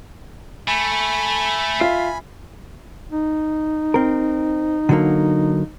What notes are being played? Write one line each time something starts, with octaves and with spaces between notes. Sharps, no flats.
A3 G#5 B5
F4 E5 C7
D#4
C4 A#4
D3 F#3 A#3